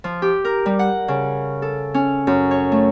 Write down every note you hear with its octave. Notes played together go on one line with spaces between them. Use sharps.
F3
G4
A#4
G3
F#5
C#3
A4
C#4
F#2
C#5
A3